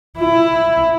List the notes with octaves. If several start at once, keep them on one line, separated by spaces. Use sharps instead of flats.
E4